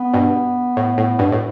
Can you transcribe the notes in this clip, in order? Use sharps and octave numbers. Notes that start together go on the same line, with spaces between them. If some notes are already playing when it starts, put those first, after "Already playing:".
Already playing: B3
G2 B2
A2
A2
G2 B2
A2